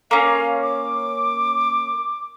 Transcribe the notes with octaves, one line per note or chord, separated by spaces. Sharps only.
A#3 C#4 F5
D6